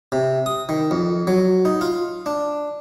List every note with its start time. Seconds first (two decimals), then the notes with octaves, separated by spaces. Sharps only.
0.12 C3
0.46 D#6
0.69 D#3
0.91 F2
1.27 F#3
1.65 D#4
1.81 F4
2.26 D4